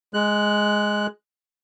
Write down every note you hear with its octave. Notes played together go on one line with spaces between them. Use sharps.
G#3 F#6